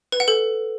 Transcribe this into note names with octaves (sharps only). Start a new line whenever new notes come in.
B4
F#5
A4